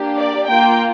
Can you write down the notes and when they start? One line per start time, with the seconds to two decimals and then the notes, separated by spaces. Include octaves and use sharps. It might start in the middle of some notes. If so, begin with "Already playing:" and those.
Already playing: A#3 D4 G4
0.19 D5
0.48 A#3 F4 G5